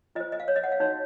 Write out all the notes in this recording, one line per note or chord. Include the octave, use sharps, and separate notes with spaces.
F4 C5 D#5
D#5
F5
C#5
D#5
F#5
F5
D#4 F#4 C#5